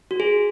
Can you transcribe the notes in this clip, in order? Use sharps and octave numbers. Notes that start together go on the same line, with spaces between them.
F#4
G#4